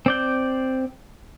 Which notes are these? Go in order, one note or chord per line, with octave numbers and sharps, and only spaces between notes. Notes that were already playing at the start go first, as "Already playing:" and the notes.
C4 D5 G6